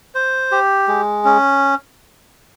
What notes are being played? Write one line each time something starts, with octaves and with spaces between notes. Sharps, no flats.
C5
G4
G#3
C#4